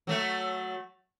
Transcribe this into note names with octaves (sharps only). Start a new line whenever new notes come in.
F#3 A3